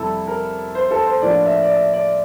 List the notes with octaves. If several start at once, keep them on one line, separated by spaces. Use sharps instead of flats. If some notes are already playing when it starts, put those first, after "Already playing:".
Already playing: F2 C3 G3 E4 A4
A#4
C5
A4
C5
A2 F3 A#3 D4 D5
E5
D5
E5
D5